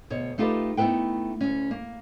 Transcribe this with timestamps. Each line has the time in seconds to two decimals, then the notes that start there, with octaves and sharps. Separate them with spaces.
0.10 D2 B2 C#5
0.38 A3 D#4 F4 G4 A4 B4
0.77 A3 B3 D#4 E4 B4 G5
1.41 D2 C#4
1.71 A#3